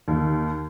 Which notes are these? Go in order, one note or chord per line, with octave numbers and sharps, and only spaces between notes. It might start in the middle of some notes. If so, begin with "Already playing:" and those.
D#2